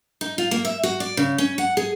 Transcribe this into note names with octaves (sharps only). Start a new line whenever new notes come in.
D#4
F4
A#3
E5
F#4
D5
C#3
C#4
F#5
G#4